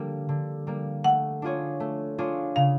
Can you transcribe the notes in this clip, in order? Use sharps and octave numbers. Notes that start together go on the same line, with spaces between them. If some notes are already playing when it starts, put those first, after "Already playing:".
Already playing: D3 G3 A#3
D3
G3 A#3
A3 F#5
D4 F4 G#4 C#5
A3
D4 F4 G#4 C#5
C#3 F5